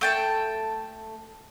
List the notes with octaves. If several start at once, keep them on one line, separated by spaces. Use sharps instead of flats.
A3 G5 A5